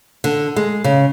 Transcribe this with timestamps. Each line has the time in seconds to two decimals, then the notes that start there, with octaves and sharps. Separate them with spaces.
0.24 D3
0.56 G#3
0.84 C#3